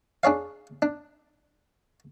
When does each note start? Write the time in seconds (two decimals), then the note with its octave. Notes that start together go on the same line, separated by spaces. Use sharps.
0.23 D4 G#4 C#5 F5
0.82 D4